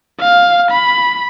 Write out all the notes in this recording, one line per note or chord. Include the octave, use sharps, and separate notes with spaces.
F5
B5